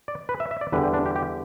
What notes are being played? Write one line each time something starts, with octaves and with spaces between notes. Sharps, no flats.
D5
B4
E5
E5
D5
E2 D3 G3 B4
G4
D4
G4
G4